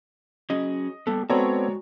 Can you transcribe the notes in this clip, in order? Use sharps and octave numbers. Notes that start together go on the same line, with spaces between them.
F#3 C#4 G#4 D#5
G3 A#3 B3 A4
G#3 B3 C4 F#4 A4 C#5 D5 A#5